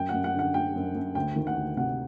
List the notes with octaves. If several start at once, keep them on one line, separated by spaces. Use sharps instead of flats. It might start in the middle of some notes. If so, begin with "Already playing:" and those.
Already playing: F#2 G5
F#5
F#2
F#5
D3 F#5
D3 G5
F#2
F#2
D2 G5
D#3
F#5
D2
C3 F#5